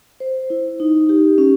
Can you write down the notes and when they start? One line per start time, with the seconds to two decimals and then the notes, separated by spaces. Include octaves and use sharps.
0.20 C5
0.50 E4
0.80 D#4
1.09 G4
1.38 C#4